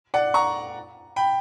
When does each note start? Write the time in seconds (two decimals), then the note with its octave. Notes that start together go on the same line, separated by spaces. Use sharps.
0.14 D5 F#5
0.34 A#5 C#6
1.16 G5 B5